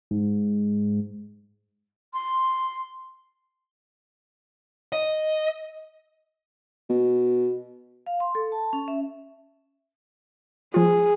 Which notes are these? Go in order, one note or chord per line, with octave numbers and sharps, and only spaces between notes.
G#2
C6
D#5
B2
F5
C6
A4
A5
C#4
E5
F3 F4 G#4